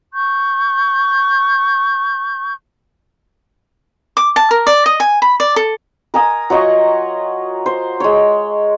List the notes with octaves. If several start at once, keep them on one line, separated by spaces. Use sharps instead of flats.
C#6 G6
D6
A5
A#4
D5
D#5
G#5
B5
D5
A4
A#4 G#5 D#6
F#3 F4 D#5 C#6
C5
G#3 C#5